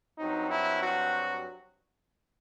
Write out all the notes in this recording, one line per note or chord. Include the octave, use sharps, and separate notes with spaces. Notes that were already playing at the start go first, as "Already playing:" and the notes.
G2 F#3 C4 D#4
E4
F#4